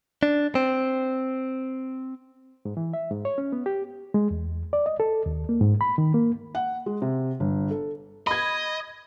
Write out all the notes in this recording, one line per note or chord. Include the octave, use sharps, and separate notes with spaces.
D4
C4
G#2
E3
E5
G#2
C#5
C#4
B3
G4
G#3
E2
D5
D#5
A4
D#2
A#3
G#2
B5
D#3
A#3
F#5
G#3
C3
G1
A4
D#5 B5 G#6